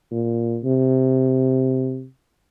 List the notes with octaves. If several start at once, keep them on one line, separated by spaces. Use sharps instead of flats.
A#2
C3